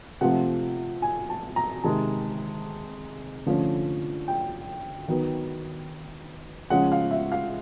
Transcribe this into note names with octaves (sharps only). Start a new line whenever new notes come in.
C3 F3 A3 C4 F#5
G#5
A5
A#5
C3 D#3 G#3 A5
D3 F3 A3 C#4
G5
D#3 F#3 B3
C#3 F3 G#3 C#4 F#5
F5
E5
F5